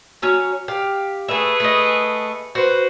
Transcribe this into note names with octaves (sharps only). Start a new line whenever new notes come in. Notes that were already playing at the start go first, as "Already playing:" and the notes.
F#3 C#4 C#5
G4 F5
A3 G#4 B4 E5
A3 D#5
F#4 B4 C5